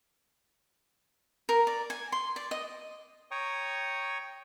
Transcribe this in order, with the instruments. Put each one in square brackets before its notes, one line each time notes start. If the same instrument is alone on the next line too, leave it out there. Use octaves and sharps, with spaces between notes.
[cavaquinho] A#4
D5
G#5
C6
D5
D#5
[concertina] C#5 G5 A#5 C#6 D#6